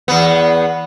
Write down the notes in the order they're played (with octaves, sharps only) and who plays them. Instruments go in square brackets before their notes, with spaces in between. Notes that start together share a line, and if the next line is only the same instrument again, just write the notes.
[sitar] E2 B3